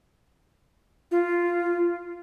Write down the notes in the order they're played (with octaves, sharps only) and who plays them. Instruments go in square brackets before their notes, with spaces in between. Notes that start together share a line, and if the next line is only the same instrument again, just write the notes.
[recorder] F4